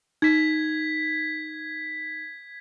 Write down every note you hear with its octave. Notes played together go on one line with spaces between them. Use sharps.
D#4 G#6 B6